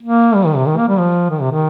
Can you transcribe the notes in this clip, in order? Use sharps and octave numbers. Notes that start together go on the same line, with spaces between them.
A#3
G3
D#3
C3
D#3
A#3
G3
F3
D#3
C3
D#3